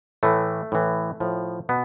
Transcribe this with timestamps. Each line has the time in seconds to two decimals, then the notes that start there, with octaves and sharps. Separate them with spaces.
0.23 A2 E3 A3
0.72 A2 E3
1.20 A2 F3
1.69 B2 B3